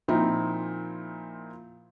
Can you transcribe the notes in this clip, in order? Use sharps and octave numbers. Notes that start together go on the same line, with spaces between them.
A#2 F3 C4 D#4 E4